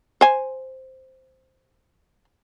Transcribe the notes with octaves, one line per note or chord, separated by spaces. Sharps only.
C5 G#5